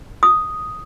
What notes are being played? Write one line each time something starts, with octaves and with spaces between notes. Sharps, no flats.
D#6